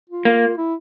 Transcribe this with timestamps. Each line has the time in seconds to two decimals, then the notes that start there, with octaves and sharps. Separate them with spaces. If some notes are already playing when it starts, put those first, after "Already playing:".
0.10 F4
0.25 A#3
0.57 E4